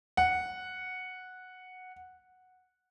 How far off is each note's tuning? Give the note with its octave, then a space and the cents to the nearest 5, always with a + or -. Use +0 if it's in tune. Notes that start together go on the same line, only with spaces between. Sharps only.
F#5 -5